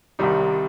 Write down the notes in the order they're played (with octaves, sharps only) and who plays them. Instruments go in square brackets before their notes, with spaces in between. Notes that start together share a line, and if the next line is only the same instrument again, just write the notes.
[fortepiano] C2 C3 D#3 G3 D#4